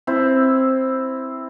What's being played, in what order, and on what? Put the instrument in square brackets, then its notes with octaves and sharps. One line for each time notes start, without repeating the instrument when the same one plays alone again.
[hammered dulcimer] C4 E4